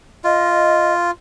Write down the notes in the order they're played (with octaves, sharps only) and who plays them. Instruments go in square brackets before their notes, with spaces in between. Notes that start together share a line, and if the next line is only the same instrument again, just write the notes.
[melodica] F4 [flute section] D#5